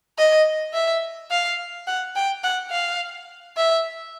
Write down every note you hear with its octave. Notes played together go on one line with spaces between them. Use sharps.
D#5
E5
F5
F#5
G5
F#5
F5
E5